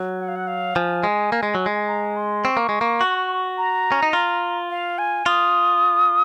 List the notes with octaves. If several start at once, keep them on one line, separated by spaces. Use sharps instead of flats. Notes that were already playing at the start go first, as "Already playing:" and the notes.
Already playing: F#3
F#5
F5
F#5
F5
F3 G#5
G#3
A#3
G#3
F#3
G#3
A#5
C6
C4 C#6
A#3
G#3
A#3
F#4
A#5
C#4
D#4
F4
F5
G#5
F4 D#6